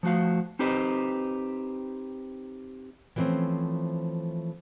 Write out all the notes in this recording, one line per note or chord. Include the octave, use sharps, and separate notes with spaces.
F3 A3 F#4 F5
C4 D#4 G4 B4 C5 D#5
E3 F3 G3 A3 C4 C#4